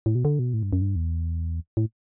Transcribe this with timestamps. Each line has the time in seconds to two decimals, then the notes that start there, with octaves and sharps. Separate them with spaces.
0.06 A2
0.15 B2
0.25 D3
0.39 B2
0.54 A2
0.63 G2
0.73 F#2
0.82 G2
0.96 E2
1.77 A2